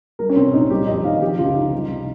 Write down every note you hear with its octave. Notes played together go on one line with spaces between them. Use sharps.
G3 A#4
C#4
C2 C4
C#4
A#2 D#4
G3 G4
F2 D#5
D#3 F5
F3 G4
C#2 F4
C#3 D#4
G3
C2